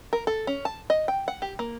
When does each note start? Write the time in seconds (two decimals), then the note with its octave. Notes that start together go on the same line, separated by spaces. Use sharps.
0.13 A#4
0.27 A4
0.47 C#4
0.65 A5
0.90 D#5
1.08 G5
1.28 F#5
1.42 G4
1.59 A#3